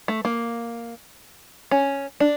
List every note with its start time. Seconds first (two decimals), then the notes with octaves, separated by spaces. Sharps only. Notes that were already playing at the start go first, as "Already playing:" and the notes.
0.08 A3
0.25 A#3
1.71 C#4
2.20 D4